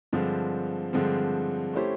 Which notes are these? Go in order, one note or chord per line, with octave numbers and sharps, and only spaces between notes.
G2 D3 F3 G#3 C4
G2 D3 F3 G#3 C4
A3 C#4 E4 G4 C5